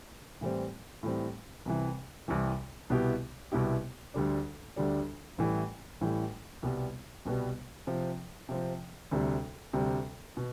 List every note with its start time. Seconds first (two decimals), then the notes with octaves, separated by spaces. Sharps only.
0.41 A2 E3 G3 C4
1.03 A2 E3 G3 C4
1.66 C2 C3 E3
2.28 C2 C3 E3
2.90 C2 B2 B3 E4 G4
3.52 C2 B2 B3 E4 G4
4.14 D2 D3 G3 D4
4.76 D2 D3 G3 D4
5.38 A1 A2 E3 G3
6.01 A1 A2 E3 G3
6.63 C2 B2 G3 B3
7.25 C2 B2 G3 B3
7.87 C3 F3 C4
8.49 C3 F3 C4
9.11 D2 C3 G3
9.73 D2 C3 G3
10.37 B2